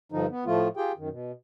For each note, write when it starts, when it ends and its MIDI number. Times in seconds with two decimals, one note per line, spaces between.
0.12 0.26 43
0.12 0.26 50
0.12 0.26 53
0.12 0.26 63
0.30 0.44 59
0.46 0.68 45
0.46 0.68 53
0.46 0.68 57
0.46 0.68 65
0.77 0.92 65
0.77 0.92 67
0.77 0.92 68
0.77 0.92 79
0.97 1.09 42
0.97 1.09 51
1.09 1.32 47